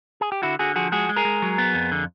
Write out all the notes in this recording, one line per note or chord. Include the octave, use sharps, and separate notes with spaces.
G#4
G4
D3 E4 F#4
D3 F#4 G#4
F3 F#4 G#4
G#3 F#4 G#4
G#3
G#4 A#4
G#3
F#3
B3
F2
D3